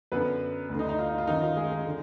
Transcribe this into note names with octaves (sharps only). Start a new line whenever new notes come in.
F#2 D3 B3 B4
D2
D3 D#4
D#4
F4
D#4
F4
F#2 D#3 D#4
F4
G#3 G#4
G#3 G#4
D3